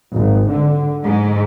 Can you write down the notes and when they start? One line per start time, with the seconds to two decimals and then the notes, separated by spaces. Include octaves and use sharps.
0.13 G#1
0.49 D3
1.05 G#2